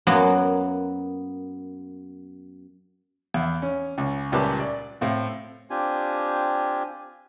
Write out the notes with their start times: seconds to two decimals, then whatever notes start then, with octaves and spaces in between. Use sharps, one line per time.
0.07 F#2 F#3 A#3 B3
3.34 E2
3.62 C#4
3.98 C#2
4.32 C#2 A#2 G3 G4 B4 A5
4.60 D5
5.01 A2 C4 F4
5.70 C4 D4 F4 G4 G#5